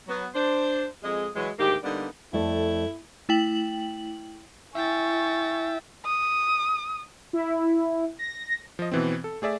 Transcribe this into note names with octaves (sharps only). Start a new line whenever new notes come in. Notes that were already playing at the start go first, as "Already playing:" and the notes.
F#3 B3
D4 C5
F2 G#3 D#5
E3 F#3 G#3
D2 G#2 D#3 A#3 G4
D3 G3 A#3 B3 D4 D#4
F2 A3 E4 D5
A3 E4 G5 F#7
E4 E5 G5 G#5 C#6 A6
D#6
E4
A#6
F3 D#5
B2 E3 C4
A4
A3 G#4 D5 E5